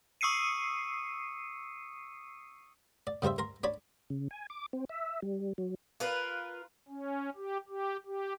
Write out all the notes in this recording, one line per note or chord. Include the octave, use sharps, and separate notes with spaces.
C#6 D#6 E6 C7 C#7 D#7
D5
C#3 G3 A#4 C5 E5
A#4 A#5 C6
D4 C#5 D5 B5
C#3
G#5
D6
C4
E5
G3
F#3
F4 A#4 B4
C#4
G4
G4
G4